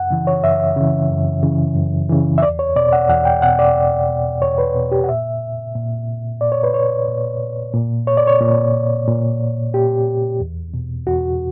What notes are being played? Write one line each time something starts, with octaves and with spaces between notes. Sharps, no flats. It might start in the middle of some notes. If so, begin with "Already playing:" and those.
Already playing: F#2 F#5
C#3 E3
C#5
F#2 E5
C#3 E3
F#2
C#3 E3
F#2
C#3 E3
E5
E2 D5
C#5
B2 D5
F#5
E2 F#5
G5
B2 F#5
D5
E2
B2
E2 C#5
B4
B2
G4
F#5
A#2 E5
A#2
A#2 D5
C#5
B4
C#5
A#2
A#2
C#5
D5
C#5
A#2
A#2
A#2 G4
E2
B2
E2 F#4